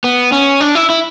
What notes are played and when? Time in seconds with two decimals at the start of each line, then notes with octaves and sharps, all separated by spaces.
0.04 B3
0.32 C#4
0.61 D4
0.75 E4
0.90 E4